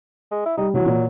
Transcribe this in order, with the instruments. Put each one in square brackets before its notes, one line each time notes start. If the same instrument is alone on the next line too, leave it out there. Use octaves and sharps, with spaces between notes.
[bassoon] G#3
E4
[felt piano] G3 [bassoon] D#4
[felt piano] E3 F#4 [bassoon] F#3
[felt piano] A#2